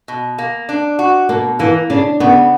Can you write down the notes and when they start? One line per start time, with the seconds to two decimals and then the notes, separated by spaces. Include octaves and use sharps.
0.08 B2
0.38 A#3
0.69 D4
0.99 F#4
1.29 B2 A#3
1.59 E3 A#3
1.90 C#3 D4
2.20 C#3 B3